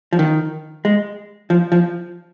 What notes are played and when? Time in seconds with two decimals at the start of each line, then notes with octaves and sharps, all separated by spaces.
0.12 F3
0.19 D#3
0.85 G#3
1.50 F3
1.72 F3